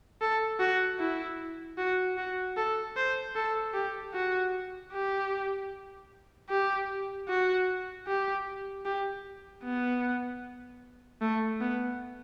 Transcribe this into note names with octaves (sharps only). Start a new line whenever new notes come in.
A4
F#4
E4
F#4
F#4
A4
C5
A4
G4
F#4
G4
G4
F#4
G4
G4
B3
A3
B3